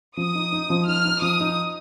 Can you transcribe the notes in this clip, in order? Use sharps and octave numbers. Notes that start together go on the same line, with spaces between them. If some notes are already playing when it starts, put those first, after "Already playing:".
F3 D#6
D#4
D#4
F3
D#4 F6
D#4
F3 D#6
D#4